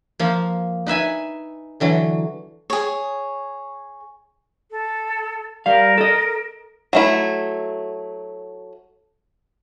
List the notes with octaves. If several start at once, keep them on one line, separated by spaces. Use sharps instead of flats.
F3 A#3
D#4 B4 E5 G#5
D3 E3 F#3
G#4 C#5
A4
G3 A#4 F5
A4 D#5
F#3 A3 E4